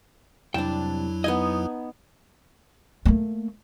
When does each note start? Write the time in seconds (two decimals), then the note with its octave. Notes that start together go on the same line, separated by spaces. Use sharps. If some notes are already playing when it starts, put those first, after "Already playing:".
0.54 C2 F2 F#3 D4 E4 G5 A5
1.24 B3 D#4 D#5 G#5
3.05 A3 A#3